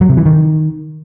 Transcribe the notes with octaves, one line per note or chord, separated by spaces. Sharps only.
F#3
C3
E3
D#3